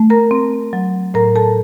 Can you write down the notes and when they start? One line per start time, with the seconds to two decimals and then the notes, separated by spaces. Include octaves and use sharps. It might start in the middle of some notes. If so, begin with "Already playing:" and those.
Already playing: A3
0.10 A#4 A#5
0.31 C4
0.73 F#3
1.14 A2 A#4 A#5
1.36 A4 A5